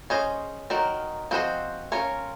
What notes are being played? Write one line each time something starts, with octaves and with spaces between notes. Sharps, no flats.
C#4 G#4 C5 D#5
D#3 F#3 A#4
F3 C4 F#4 C5 D#5
C#4 F4 A#4 C#5